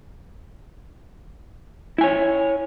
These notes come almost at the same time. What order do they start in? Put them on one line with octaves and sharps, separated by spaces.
E4 G#5 C#5